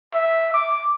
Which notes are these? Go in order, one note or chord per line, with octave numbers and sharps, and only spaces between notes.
E5
D6